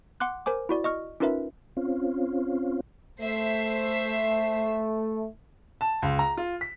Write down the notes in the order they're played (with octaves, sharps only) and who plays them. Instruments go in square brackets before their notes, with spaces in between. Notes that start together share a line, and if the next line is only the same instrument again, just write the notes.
[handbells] F#5 C6 D6 F#6
A#4 C5 G#5 D6
E4 F#4 D5
D#5 C#6 F6
C#4 D#4 F4 A#4 B4 E5
[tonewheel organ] C4 C#4 F4
[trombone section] A3 [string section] C5 E5 C7
[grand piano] A5
C#2
A#5
F4
B6